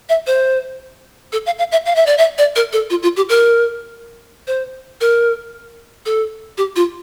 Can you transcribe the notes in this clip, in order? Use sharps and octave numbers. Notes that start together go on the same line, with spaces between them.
E5
C5
A4
F5
F5
E5
F5
E5
D5
E5
D5
A#4
A4
F4
F4
G4
A#4
C5
A#4
A4
G4
F4